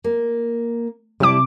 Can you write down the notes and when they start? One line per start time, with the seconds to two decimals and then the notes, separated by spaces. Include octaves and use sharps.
0.04 A#3
1.20 C3 G3 E4 A5 D6